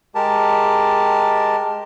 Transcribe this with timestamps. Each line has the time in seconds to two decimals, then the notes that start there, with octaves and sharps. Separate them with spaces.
0.15 G#3 G4 A#4 A5